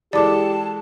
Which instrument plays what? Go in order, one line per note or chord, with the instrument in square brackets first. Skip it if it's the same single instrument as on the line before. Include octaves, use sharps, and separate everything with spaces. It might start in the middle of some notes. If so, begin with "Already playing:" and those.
[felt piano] E3 G#3 A4 [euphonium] G4 [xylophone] D5 D6 [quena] A5